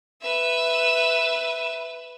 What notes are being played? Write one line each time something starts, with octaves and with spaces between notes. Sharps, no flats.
B4 E5